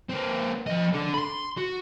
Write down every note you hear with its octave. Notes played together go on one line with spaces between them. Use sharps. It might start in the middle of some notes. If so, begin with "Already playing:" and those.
A#3 C4
F3 D#5
D4 A4
B5 C6
F#4